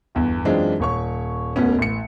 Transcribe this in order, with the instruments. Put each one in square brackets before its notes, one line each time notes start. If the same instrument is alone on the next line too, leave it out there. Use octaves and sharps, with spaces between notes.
[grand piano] G1 E2
F#2 E3 G#3 C4 D4 F4
D#1 C#5 C#6
E1 D2 B2 B3 C#4
A1 C#7